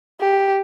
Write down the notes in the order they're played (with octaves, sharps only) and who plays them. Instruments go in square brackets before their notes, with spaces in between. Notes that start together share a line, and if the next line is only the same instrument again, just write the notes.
[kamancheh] G4